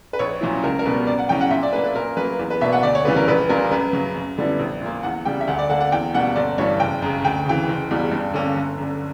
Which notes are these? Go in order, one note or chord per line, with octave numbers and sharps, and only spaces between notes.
B4
A#1 C#5
A#2 F#3 C#4 E4
C#2 A#4
A#4
B2 G3 B3 B4
F#2 D5
F#5
C#3 F#3 C#4 E4 G5
F#5
A#2 E5
D5
A#3 D4 B4
B4
A#2 A#4
F#3 A#3 B4
E2
B4
B2 A#3 D4 E5
F#5
D2 D5
C#5
C#3 E3 G3 C#4 B4
A#4
A#1 B4
A#2 G3 A#3 D4 A#4
F#2 B4
C#3 F#3
F#2
D3 G3 B3 E4
A#1
A#2 A#3
E2 F#5
C#3 G3 G5
E5
D2 F#5
D5
D3 A#3 D4 F#5
F#5
E2 G5
B2 G3 A#3 F#5
G1 D5
G2 E3 G3 C#5
F#1 G5
F#2 C#3
D2 G5
C#3 E3 G5
F#1
E2 C#3 G3
G2
D3 A#3 C#4
G1
F#2 D3